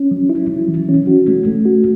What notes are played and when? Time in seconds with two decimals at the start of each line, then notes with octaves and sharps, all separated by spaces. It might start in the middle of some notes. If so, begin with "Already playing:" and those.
Already playing: C#4
0.11 F#3
0.30 E4
0.50 F#3
0.68 E3
0.89 C#4
1.07 F#4
1.28 A3
1.46 A3
1.65 F#4